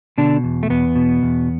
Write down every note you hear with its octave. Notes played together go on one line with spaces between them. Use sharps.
B2 D3 D4
E2
A3
E2 B3
B2
E2